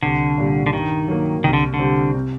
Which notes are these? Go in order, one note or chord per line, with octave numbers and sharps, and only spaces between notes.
C2 D3
A#2 G3
D3
G2 D#3
F#3 A#3
C2 D#3
D3
D3
C3 G3 C4
C3